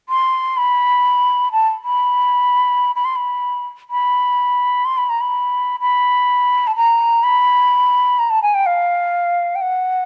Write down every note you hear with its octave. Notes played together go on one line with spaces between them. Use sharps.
C6
B5
A5
B5
B5
C6
B5
B5
C6
B5
A#5
B5
B5
A5
A#5
B5
A#5
A5
G#5
G5
F5
G5
F#5